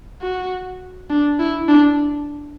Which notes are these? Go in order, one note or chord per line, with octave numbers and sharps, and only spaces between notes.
F#4
D4
E4
D4